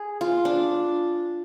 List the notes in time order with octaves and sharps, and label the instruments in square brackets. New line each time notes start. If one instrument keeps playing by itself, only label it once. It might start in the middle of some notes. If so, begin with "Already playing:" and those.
Already playing: [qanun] G#4
F4
D4